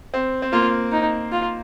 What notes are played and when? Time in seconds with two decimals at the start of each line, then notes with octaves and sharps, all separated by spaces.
0.14 C4
0.42 C4
0.52 A#3 F4
0.92 D#4
1.32 F4